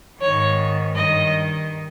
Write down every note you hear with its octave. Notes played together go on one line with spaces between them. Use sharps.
D#3 C#5
G#2
G2 D#5
D#3